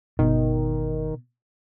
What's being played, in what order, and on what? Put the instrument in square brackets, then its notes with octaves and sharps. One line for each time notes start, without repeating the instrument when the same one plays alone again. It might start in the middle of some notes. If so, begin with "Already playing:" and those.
[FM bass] G1 [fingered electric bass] B2 [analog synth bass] D#3